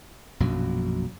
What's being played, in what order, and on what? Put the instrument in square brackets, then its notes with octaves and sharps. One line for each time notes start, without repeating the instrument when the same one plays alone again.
[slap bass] A#1 F#2 B2 F#3